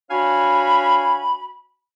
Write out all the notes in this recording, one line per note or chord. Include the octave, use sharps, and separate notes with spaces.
D4 F#4 C#5 F5 G#5 B5